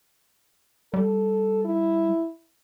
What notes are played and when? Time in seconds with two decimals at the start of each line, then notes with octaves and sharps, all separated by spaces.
0.94 G3 A4
1.65 E4